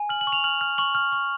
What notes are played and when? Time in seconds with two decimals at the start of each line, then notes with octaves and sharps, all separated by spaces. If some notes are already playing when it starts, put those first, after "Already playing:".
Already playing: G#5
0.09 F6 F#7
0.21 F#7
0.27 C#6
0.32 F7
0.44 F6 F#7
0.61 F6
0.78 C#6 F#7
0.95 F6
1.12 C#6